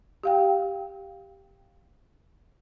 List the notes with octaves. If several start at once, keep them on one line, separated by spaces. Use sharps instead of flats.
G4 F5 G5